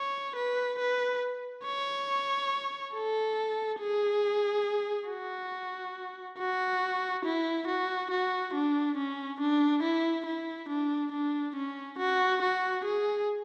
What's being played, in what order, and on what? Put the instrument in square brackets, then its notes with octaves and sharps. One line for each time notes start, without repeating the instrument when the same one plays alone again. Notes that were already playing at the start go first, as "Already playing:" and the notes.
Already playing: [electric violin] C#5
B4
B4
C#5
A4
G#4
F#4
F#4
E4
F#4
F#4
D4
C#4
D4
E4
E4
D4
D4
C#4
F#4
F#4
G#4